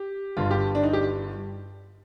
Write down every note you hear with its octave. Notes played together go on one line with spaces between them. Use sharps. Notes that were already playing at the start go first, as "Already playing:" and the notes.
Already playing: G4
G1 G2 D3 F4
G4
D4
D#4
G4